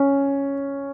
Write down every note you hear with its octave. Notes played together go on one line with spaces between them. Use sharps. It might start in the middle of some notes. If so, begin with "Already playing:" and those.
Already playing: C#4